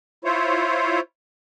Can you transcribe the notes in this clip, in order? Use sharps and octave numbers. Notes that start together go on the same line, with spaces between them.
E4 F4 C5 C#5